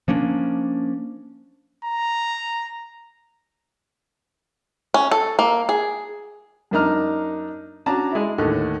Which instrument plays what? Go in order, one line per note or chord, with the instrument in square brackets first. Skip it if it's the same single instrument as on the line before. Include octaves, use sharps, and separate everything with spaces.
[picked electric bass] F3 A#3 C#4 D4
[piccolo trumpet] A#5
[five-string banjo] C#4
A4
A#3
G#4
[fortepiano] F#2 A#3 D4 D#4 A#5 F6
C#4 D4 F#4 A5 A#5
G#3 E4
D#2 A2 D3